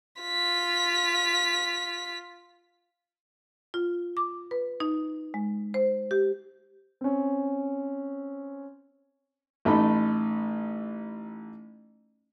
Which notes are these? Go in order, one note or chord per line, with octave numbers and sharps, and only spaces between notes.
F4 B6
F4
D6
B4
D#4
G#3
C5
G4
C4 C#4
A1 A3 D#4 B5